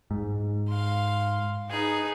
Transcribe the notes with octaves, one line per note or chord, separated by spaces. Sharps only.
G#2
F5 C6
D#4 G#4 B4